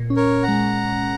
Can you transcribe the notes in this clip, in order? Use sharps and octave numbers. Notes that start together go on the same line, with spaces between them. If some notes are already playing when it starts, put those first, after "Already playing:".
Already playing: A#2
C#4
A#4 C#5
A#2
F#5 A#5
G#3